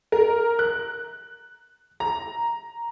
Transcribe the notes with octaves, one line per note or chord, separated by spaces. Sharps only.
A#4
F#6
A#5